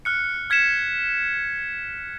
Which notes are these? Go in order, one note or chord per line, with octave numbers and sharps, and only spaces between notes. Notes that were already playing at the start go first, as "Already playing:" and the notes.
F6 F#6 C#7
F6 G#6 B6 C#7 E7